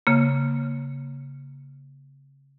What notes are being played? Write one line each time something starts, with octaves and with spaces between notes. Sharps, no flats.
C#3 A#3